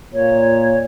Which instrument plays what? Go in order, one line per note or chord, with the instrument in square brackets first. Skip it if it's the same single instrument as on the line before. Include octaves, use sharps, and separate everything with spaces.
[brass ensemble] A#2 [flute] C#5